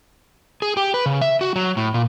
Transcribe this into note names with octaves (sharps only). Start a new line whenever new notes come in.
G#4
G4
B4
C#3
E5
F#4
F#3
A2
A#2